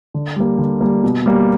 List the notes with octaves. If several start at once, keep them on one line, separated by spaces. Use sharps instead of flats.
D3
G3 A#3
D3
G3 A#3
B2
G3 A#3